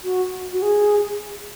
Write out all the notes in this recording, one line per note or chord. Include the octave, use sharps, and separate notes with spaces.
F#4
F#4
G#4